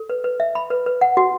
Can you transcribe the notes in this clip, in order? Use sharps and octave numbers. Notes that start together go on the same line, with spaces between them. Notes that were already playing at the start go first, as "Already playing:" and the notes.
Already playing: A4
B4
B4
E5
B5
B4
B4
F#5
F#4